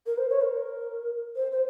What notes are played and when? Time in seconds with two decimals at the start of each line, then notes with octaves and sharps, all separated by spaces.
0.06 A#4
0.18 C5
0.30 C#5
0.41 A#4
1.36 C5
1.52 C5